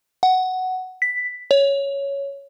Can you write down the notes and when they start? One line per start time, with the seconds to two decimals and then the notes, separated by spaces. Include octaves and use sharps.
0.23 F#5
1.02 B6
1.51 C#5